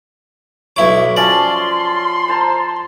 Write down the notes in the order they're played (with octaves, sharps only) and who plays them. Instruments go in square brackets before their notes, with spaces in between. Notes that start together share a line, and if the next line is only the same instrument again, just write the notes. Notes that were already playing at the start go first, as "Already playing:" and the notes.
[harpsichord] B1 E4 D6 [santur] C#5
[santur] F3 C#4 A5 [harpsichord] D5 [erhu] C6
[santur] C5 A5 A#5